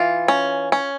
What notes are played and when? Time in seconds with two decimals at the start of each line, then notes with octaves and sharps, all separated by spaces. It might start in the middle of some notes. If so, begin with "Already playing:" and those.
Already playing: E3 F4
0.28 C#4
0.72 C#4